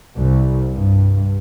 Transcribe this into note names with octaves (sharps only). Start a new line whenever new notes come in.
C2
G2